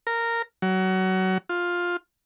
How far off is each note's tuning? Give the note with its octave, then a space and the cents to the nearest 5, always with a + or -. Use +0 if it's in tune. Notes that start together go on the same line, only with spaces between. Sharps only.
A#4 -10
F#3 +25
F4 +10